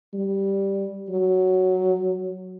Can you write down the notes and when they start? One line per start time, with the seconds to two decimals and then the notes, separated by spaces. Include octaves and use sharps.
0.14 G3
1.09 F#3